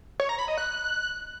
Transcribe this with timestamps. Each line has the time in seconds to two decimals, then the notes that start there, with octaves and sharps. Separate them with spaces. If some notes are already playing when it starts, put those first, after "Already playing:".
0.20 C#5
0.29 A#5
0.39 B5
0.48 D#5
0.58 F#6